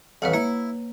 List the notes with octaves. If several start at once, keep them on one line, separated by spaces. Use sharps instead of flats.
A1 F2 B4 C#5 F#5
A#3 E4